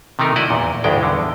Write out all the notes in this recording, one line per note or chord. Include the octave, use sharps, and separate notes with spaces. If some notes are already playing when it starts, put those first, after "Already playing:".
C3 D#3 A3 D#4 A#4
E4 F#4 D5 D#5
E2 A#2
A1 D2 G2 G#3 G5
E2 D3